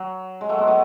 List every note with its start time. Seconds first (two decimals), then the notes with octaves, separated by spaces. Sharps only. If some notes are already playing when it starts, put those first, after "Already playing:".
Already playing: F#3
0.41 G#3
0.49 F#3 A3
0.58 G#3 B3
0.67 F#3 A3